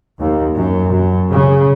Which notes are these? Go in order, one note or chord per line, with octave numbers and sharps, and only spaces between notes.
D#2
F#2
F#2
C#3